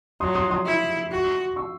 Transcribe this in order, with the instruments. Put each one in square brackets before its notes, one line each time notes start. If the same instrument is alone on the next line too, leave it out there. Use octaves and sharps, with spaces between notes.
[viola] F#3 [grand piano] C6 D#6
[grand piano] C6 D#6
C6 D#6
[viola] E4
F#4
[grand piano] C#6 E6